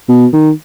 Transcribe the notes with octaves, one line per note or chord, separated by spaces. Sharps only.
B2
D#3